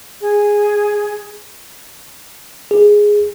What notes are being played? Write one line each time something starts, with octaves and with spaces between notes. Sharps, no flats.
G#4
G#4